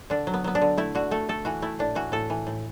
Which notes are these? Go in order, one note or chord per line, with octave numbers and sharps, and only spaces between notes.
D3 D4
F#3
B3
F#3 B3
D4
D3
A3 E4
D3 F#4
A3 A4
A3 A4
E3 F#4
A3 E4
A2 D4
E3 F#4
A2 A4
E3
A2